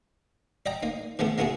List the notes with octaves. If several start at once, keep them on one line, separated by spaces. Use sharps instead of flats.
D5 D#5 G5 A#5
A#3 D#4
D#3 G#3 A3 B3 A4
G#3 A#3 B3 E4 F#4 G#4